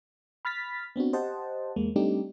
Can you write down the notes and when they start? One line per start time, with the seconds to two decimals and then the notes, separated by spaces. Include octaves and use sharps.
0.45 B5 F6 A6 B6
0.96 B3 C4 D4 F#4
1.13 G4 C5 D#5 F#5 A5
1.76 E2 G#3 A#3
1.96 G3 A3 C4 D4 D#4 G4